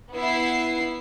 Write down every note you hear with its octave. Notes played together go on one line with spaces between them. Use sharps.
B3 E4 C7